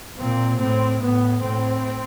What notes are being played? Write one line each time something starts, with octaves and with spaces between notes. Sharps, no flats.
A#2 C4
A2 C4
A2 B3
A2 C4